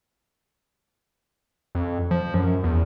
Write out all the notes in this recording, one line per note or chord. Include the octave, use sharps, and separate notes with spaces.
F2
F3
F#2
E2